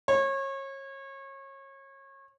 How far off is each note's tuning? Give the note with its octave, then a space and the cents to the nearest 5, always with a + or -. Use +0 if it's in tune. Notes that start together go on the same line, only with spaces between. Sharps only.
C#5 -30